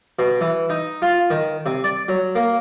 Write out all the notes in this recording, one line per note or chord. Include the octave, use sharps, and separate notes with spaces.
B2
E3
D#4
F4
D#3
C3
D5
F#3
A#3